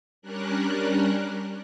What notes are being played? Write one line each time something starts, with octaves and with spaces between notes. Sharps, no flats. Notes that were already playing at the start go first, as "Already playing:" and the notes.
G3 C#4 D4 A#4 F#6